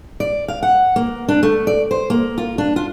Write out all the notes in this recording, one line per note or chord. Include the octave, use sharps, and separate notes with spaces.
D5
F5
F#5
A#3
D4
A3
D5
C5
A#3
F4
D4
F4